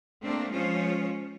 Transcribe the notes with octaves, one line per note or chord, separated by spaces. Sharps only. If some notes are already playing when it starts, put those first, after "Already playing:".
A3 A#3 C4 D4
F3 G#3 C#4 F4 C5 C#5